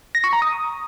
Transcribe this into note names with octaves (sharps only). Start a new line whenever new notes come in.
A#6
C#6
A#5
D#6